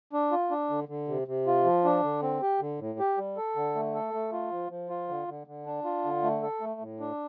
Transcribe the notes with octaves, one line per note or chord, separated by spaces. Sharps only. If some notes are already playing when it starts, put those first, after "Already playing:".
D4
F4
D4
D3
D3
C3
C3
F4
F3
D4
D3
C4
G4
D3
A2
G4
G3
A4
D3
A3
A4
A3
F4
F3
F3
F4
D3
D3
D3
D4
F4
D3
A3
A4
A3
A2
D4